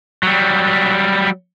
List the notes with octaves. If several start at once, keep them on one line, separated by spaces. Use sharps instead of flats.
F#3 G3